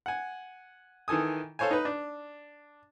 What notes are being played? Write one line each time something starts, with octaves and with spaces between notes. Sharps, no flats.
F#5 G#5
D#3 E3 A4 G#5 D#6
A4 C5 C#5 F5 G#5
D#4 B4
D4